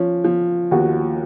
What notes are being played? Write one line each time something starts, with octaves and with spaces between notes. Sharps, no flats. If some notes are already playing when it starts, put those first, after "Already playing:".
Already playing: F3 C#4
F3
D#2 F#4